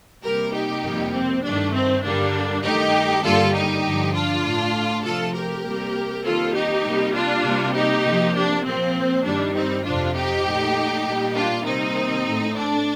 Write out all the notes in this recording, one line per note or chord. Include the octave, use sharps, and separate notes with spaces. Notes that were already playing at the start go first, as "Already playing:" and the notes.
C3 G3 A#3 G4 A#4
D#4 G4
F2 C3 G3 A#3
C4
G2 D#3 A3 D4
C4
G2 D3 G3 A#3 D4
G2 D#3 A3 D#4 G4
G2 D3 G3 A#3 F4 A4
D#4 G4
G2 D3 F3
D4 F4
A2 A3
C3 F3 A3 F4 A4
G4 A#4
C3 G3 A#3
F2 D#3 G3 A#3 F4 A4
D#4 G4
C3 G3 A#3
D4 F4
C3 G3 A#3
D#4 G4
C3 F3 A#3
D4
A#2 F3 A#3 C4
G2 D#3 G3 D4
C4 D#4
F2 C3 F3 D4 F4
D#4 G4
A#2 A3
A#2 G3 A#3
D4 F4
C3 D#3 G3 A#3 C4 D#4
A2 A3
D4